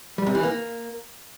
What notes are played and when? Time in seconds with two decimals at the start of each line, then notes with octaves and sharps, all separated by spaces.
0.18 G3
0.27 C3
0.35 E3
0.43 A#3